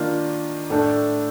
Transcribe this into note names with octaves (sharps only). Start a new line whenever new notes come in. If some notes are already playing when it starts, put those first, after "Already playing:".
Already playing: D#3 A#3 D4 F4
A2 A3 D4 A4